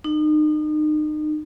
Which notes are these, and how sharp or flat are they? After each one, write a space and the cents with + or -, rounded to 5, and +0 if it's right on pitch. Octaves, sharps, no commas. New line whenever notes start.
D#4 -35